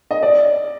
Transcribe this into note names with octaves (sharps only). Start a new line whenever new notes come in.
D#5
D5